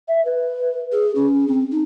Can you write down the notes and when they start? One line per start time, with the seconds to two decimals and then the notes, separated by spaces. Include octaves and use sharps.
0.08 E5
0.25 B4
0.92 G#4
1.15 C#4
1.48 C4
1.71 D#4